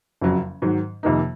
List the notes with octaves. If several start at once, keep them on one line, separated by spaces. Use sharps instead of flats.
F#1 F2 C#3 F#3
G#2 D#3 F#3
F2 C3 D#3 A#3 D#4